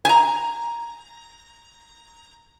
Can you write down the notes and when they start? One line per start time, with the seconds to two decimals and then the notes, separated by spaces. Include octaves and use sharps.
0.05 G#5 A#5